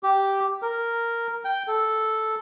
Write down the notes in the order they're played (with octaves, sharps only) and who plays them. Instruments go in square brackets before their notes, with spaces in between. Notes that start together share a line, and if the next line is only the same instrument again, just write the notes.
[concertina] G4
A#4
G5
A4